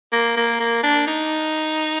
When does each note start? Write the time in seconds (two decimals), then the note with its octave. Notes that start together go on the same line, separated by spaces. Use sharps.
0.12 A#3
0.36 A#3
0.60 A#3
0.83 D4
1.07 D#4